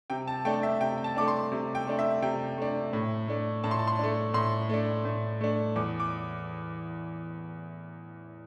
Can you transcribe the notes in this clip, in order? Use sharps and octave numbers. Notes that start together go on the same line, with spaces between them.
C3 G5
A5
A3 D4 G5
E5
C3 G5
G5
A5
A3 D4 D6
C6
C3
G5
A3 D4
E5
C3 G5
A3 D4
A2
A3 D4
A2 A5
C6
A5
C6
A3 D4
A2 C6
A3 D4
A2
A3 D4
E2 D6
D6